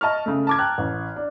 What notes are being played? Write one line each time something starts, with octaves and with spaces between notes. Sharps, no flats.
D#5 A5 C#6 F6
C#3 A3
A5 D6 G#6
G5 A5 A#5 F6 F#6
A1
D4